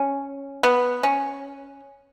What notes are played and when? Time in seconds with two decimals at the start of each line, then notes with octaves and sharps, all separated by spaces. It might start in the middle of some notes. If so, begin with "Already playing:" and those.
Already playing: C#4
0.63 B3
1.03 C#4